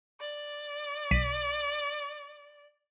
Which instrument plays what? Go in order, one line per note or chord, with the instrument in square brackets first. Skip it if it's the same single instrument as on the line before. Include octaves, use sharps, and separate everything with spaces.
[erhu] D5
[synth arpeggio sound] B1 B6 D#7